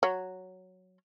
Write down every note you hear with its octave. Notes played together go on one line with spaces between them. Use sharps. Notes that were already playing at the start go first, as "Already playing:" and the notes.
F#3 C#5